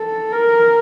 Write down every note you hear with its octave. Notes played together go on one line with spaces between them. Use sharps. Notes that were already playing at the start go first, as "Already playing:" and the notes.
Already playing: A4
A#4